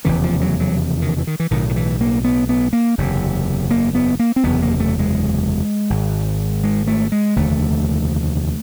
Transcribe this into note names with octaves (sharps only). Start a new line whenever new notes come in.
F1 E2 C#3 E3
F3
F#3
F#3
D#3
E3
D#3
E3
B1 A2 D#3
D#3
E3
A#3
B3
B3
A#3
F#1 E2 C3
A#3
B3
A#3
C4
F#1 E2 C3 B3
A#3
A3
G#3
G#1 G#2
G#3
A3
G#3
F1 D#2 D3 A3